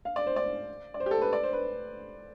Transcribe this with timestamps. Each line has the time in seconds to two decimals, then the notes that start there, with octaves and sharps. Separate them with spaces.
0.05 F5
0.16 D5
0.27 C5
0.36 D5
0.94 D5
1.00 C5
1.06 G4
1.11 A4
1.22 B4
1.33 D5
1.43 C5
1.53 B4